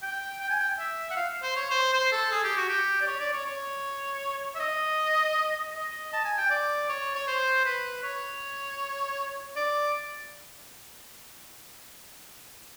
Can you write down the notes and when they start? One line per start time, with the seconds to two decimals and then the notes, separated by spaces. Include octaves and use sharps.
0.02 G5
0.40 G5
0.50 G#5
0.59 G5
0.79 E5
1.11 F#5
1.16 F5
1.42 C5
1.56 C#5
1.70 C5
1.93 C5
2.12 A4
2.32 G#4
2.44 G4
2.57 F#4
2.69 G4
3.01 D5
3.07 C#5
3.20 D5
3.33 C#5
3.46 C#5
4.55 E5
4.60 D#5
5.75 D#5
6.13 A5
6.25 G#5
6.38 G5
6.50 D5
6.89 C#5
7.15 C#5
7.27 C5
7.65 B4
8.03 C#5
9.56 D5